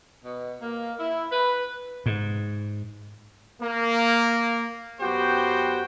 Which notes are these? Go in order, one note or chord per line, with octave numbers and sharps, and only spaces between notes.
B2
A#3
E4
B4
G#2
A#3
F#2 B3 F#4 G4 C5 G5